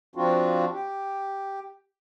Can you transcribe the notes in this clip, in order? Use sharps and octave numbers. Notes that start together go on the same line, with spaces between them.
F3 C4 D4 F4 F#4
G4